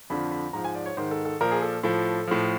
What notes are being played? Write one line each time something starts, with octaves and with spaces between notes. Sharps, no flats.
F2 D3 F3 B5
B5
G#2 F3 A#5
G#5
D5
C#5
G#2 D#3 C5
A4
A4
A#2 F3 A#4
G#4
A4
A2 F3 A4
A2 F3